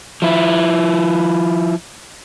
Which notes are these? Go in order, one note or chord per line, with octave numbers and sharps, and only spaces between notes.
F3 E4